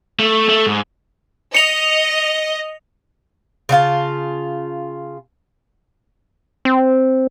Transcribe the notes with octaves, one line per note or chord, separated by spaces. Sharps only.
A3
A3
G#2
D#5 C#7 F7
C#3 D4 F4 A5
C4